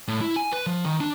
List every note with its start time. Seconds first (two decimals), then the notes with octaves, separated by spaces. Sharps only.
0.08 A2
0.21 E4
0.36 G#5
0.52 B4
0.67 F3
0.86 D#3
1.00 D4